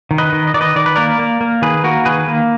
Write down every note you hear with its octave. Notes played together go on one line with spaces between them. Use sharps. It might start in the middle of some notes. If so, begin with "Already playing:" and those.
D#3
B4 D#5
D#3
D#5
D#3 D5
B4 D#5
D#3 D5
B4
A#3 A#4 D5
A#3
A#3
D#3 G#4 B4
A#3 F#4 A#4
D#3 G#4 B4
A#3